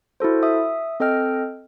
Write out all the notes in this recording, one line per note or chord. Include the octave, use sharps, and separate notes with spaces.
E4 F#4 A4 C5
E5 D#6
C4 A4 D#5 G5 F6